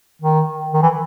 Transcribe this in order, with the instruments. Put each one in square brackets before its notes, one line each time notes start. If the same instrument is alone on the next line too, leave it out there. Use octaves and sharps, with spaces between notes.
[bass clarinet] D#3
D#3
E3